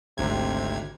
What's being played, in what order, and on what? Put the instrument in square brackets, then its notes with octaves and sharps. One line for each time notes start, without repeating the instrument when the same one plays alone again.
[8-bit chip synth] G#1 D2 G#6 [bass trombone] C3